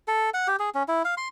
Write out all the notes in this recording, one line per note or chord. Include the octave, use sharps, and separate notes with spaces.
A4
F#5
G4
G#4
C#4
E4
F5
C6